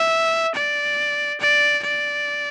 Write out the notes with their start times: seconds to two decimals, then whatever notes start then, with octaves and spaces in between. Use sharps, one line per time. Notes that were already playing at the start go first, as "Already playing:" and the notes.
Already playing: E5
0.55 D5
1.40 D5
1.83 D5